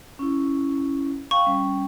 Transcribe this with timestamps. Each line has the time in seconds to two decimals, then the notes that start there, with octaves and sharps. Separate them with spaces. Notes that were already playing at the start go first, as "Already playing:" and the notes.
0.19 C#4 E4
1.31 F5 G5 C#6
1.46 G3 C#4 G5